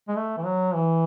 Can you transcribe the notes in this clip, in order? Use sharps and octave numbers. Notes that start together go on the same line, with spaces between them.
G#3
A3
E3
F#3
E3